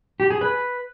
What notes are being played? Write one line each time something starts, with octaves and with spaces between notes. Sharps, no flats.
G4
G#4
B4